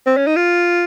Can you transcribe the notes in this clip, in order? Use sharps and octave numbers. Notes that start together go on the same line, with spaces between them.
C4
C#4
D#4
F4